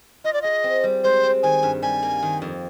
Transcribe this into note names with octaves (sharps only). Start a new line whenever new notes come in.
F4 D#5
D5
G#4 D#5
C4
G3
G#3 C5
C4
D#3 G#5
G2
G3 G#5
A#3
D#3
F2